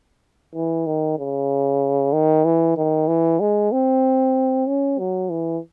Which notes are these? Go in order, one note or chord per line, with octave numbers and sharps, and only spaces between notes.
E3
D#3
C#3
D#3
E3
D#3
E3
G#3
C4
C#4
F#3
E3